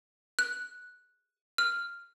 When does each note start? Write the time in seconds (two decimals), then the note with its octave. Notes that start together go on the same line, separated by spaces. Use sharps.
0.39 F#6
1.58 F6